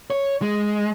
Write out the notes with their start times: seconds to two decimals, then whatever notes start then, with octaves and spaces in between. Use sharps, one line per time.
0.10 C#5
0.42 G#3